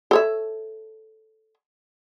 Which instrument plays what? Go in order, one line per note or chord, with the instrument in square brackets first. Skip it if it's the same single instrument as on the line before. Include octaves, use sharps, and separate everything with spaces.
[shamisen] A4 C#5 E5